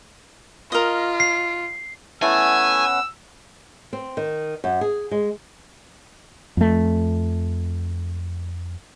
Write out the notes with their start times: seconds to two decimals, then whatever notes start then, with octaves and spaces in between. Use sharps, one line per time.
0.72 F4 A#4 D#5
1.20 C7
2.22 E3 A3 B3 C#4 F#5 G#5 E6
3.93 C4
4.17 D#3
4.64 F#2
4.81 G#4
5.11 G#3
6.57 F2 A3